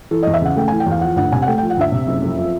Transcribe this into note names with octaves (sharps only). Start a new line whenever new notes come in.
E3 A4
E2 D#5
E5
C#3 F#5
A3 G5
E3 G#5
G5
E2 F5
F3 F#5
D2 F#5
C3 G#5
F#5
A3 G5
F3 G5
F#5
D2 E5
C3
F#1
F2
F3